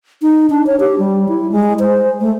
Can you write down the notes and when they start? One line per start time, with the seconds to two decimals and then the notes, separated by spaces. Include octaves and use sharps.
0.22 D#4
0.50 D4
0.67 C#5
0.80 G4
0.98 G3
1.29 E4
1.52 G#3
1.79 C5
2.21 A3